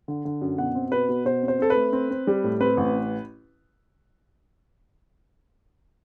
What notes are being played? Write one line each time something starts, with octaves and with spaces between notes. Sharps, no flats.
D3
D3
F#2
B2 F#5
C4
B2 B4
B2
B2 C5
C4
C5
C4 A4
B4
A3
C4
C4
G3
A2
C4 B4
A1